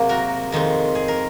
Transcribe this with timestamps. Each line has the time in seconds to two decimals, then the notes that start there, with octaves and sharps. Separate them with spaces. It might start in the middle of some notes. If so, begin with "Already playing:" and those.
Already playing: C3 F#3 A#3 G#4
0.09 F#4 A#4
0.52 F2 D#3 G#3 C4
0.95 G#4
1.08 A#4